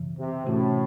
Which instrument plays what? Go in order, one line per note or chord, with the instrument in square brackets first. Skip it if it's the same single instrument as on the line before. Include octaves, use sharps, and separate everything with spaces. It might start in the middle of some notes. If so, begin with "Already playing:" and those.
Already playing: [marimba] F#2 C#3 E3
[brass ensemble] C3
[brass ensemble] A2 [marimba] C3 E3 A3 C#4 F#4